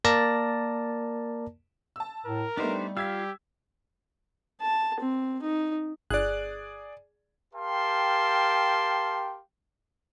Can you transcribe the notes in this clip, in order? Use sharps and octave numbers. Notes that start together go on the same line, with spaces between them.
A#3 A#4 D5 A5 A#6
A5 E6
A2 A#4
G3 A3 B3 D4 D#4 G4 C5
F4 G4 F5 E6 G#6 B6
A5
C4
D#4
G1 G#4 D5 F#6
G4 A#4 F5 G5 A5 C6